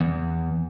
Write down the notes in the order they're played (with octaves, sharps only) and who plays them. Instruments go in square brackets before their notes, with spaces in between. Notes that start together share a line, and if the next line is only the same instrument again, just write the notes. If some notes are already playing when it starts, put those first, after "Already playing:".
[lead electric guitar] E2